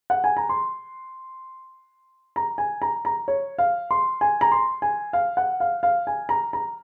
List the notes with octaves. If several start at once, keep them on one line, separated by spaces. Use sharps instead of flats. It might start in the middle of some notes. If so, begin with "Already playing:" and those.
F#5
G#5
A#5
C6
A#5
G#5
A#5
A#5
C#5
F5
C6
G#5
A#5
C6
G#5
F5
F#5
F5
F5
G#5
A#5
A#5